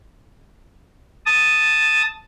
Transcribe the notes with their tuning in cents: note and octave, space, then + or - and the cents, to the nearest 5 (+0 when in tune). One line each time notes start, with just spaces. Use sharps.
A5 +0 D#6 +0